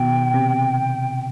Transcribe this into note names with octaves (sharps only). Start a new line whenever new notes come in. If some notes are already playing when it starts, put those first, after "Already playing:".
Already playing: B2 D#3 G5
C3